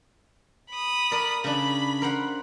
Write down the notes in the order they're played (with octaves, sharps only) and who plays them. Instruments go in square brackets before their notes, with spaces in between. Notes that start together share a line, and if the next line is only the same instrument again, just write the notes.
[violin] B5 D#6
[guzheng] A#4 D5
[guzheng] C#3 D4 [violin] B5
[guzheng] A#4 C5 F#5